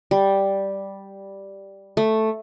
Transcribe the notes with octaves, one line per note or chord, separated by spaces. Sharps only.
G3
A3